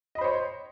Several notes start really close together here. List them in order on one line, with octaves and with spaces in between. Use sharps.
D#5 B5 C5 C#5